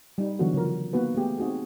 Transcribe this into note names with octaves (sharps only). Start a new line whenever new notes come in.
G3 D#4
D3 E3 F#3 B3 F#4 A4
C#3 F3 A#4
A#3 B3 D#4 F#4 B4
A3 B3 G4 G#4
C4 D#4 F#4 G#4